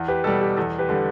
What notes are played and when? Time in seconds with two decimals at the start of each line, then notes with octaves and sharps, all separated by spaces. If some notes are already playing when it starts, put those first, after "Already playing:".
Already playing: E2
0.08 G4 B4
0.24 B2 G3 A4
0.41 G4
0.57 E2 A4
0.78 G4 B4
0.89 D3 G3